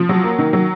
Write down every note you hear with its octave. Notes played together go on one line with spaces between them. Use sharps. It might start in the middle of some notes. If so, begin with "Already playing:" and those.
Already playing: F3
F#3
A#3
D#3
F#3